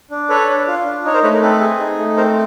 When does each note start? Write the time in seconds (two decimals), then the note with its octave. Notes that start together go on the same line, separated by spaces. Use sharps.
0.11 D4
0.30 A4 B4 C#5
0.49 D4
0.68 F4
0.85 D4
1.05 D#4 C#5
1.14 A#4 C5
1.23 A3 B4 C#5
1.33 A#4
1.42 C4 A4 B4
1.61 G#4
1.79 D#4
1.98 A3
2.17 C4 A#4 C5